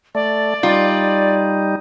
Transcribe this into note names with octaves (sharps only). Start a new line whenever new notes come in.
A3 D5
G3 D#4 F4